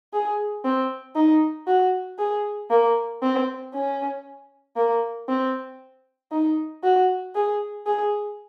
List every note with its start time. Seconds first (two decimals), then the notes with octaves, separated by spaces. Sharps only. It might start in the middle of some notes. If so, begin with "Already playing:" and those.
0.13 G#4
0.65 C4
1.16 D#4
1.67 F#4
2.19 G#4
2.71 A#3
3.23 C4
3.74 C#4
4.76 A#3
5.29 C4
6.32 D#4
6.84 F#4
7.35 G#4
7.86 G#4